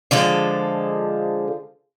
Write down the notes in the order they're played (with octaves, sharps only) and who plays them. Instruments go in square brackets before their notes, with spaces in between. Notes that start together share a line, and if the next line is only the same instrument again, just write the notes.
[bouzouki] D3 F3 G#3 A4